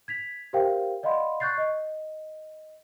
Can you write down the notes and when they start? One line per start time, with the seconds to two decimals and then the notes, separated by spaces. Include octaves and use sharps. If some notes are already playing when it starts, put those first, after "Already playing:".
0.08 G#6 B6 F7
0.53 G4 A#4 C5 E5 F5 G5
1.03 D5 D#5 F5 F#5 B5 C6
1.40 C#6 F#6 G6 A6 C7
1.58 D#5